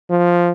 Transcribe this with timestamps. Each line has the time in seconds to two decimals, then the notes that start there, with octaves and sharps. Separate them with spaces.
0.10 F3